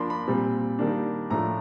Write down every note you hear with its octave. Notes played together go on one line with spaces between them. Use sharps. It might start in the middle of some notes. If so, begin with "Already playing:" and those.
Already playing: F3 A#3 D4 B5 C6
B5
A#2 G3 C4
D#3 G3 A#3 D4
A2 F3 A3 D4 A#5